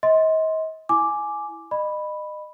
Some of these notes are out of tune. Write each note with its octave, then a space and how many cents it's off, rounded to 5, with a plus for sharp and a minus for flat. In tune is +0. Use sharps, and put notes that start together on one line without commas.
D#5 +35 C6 +0
E4 +0 G#5 +10 D6 +0
D#5 -35 B5 +0